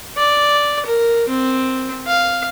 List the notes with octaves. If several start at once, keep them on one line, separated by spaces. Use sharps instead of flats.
D5
A#4
C4
F5